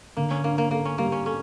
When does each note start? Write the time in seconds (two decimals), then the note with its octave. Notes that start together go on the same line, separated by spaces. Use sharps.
0.17 D3 A#3
0.31 C#4
0.44 A#3 D4
0.58 A#3
0.71 A#3 A4
0.85 C#4
0.98 G3 A#3
1.12 C#4
1.26 C#4 A4